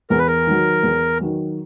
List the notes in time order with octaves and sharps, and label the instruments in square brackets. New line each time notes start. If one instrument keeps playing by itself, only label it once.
[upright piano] E2 [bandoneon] A#4
[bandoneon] B4
A#4
[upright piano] D#3 F#3
E2
D#3 F#3